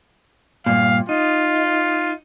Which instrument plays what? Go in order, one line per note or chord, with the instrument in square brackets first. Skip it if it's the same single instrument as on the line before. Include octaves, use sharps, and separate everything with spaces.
[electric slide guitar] G2 A#2 [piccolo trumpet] F5
[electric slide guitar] D#4 [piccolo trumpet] F4